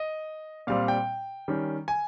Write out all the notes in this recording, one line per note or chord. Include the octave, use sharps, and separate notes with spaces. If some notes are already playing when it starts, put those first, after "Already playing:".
Already playing: D#5
A#2 G3 C4 F5
G5
D#3 G3 C#4
G#5